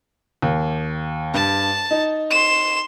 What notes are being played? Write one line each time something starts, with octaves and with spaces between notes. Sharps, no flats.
D#2
G2 A5
D#4
C6 E7